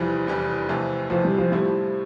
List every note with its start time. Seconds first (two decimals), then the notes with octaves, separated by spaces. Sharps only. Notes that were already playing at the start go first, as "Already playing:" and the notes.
Already playing: F1 E2 E3 F3 G3
0.27 F1 E2 E3 G3
0.69 F2 C3 E3 A3
1.10 F2 C3 E3 F3 A3
1.25 G3
1.38 F3
1.52 A2 F3 G3 A3 C4 E4